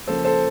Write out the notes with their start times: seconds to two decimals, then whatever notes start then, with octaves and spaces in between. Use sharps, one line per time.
0.07 C#3 F3 A#3 A4 C5
0.25 A4 C5